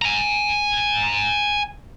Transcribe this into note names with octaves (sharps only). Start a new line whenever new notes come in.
G#5 A#5